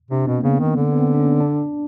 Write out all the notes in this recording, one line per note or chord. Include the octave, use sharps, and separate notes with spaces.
C3 D4
B2 C4
A#3
C#3 B3
D#3 B3
D3
B3
C4
D4
C#4
D4